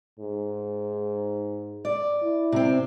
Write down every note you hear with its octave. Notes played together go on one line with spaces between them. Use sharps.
G#2
D5
E4
C3 C4